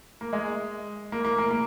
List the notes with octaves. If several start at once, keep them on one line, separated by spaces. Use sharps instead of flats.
A#3
G#3
A#3
A#3
A#3
A#3